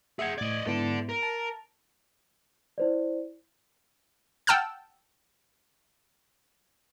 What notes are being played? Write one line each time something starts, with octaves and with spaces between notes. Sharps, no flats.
G#4 E5 F#5 G#6
A2 D5 D#5 G#6
G#2 B3 E4 A4 D5
A#4
A5
E4 C5 D5
F#5 G5 A5 E6 F6 G6